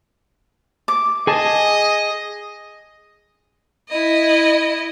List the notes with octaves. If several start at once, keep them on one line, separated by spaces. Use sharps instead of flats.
D6
G#4 D#5 G#5 A5
E4 D#5